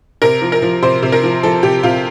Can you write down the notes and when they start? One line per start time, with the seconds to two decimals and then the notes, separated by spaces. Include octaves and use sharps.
0.22 C3 A#4
0.42 F3
0.52 A#4
0.62 F3
0.82 C3 C5
1.02 C3
1.12 A#4
1.23 F3
1.43 F3 A4
1.63 C3 G4
1.83 C3 F4